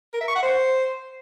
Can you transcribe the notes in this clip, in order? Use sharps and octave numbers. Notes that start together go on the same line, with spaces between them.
A#4
E5
C#6
F#5
C5